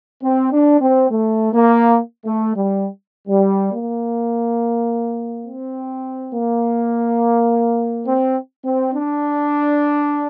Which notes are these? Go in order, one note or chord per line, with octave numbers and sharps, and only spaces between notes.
C4
D4
C4
A3
A#3
A3
G3
G3
A#3
C4
A#3
C4
C4
D4